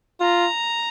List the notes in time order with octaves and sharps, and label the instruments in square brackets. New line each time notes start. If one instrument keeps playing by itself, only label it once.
[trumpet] F4 [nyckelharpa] A#5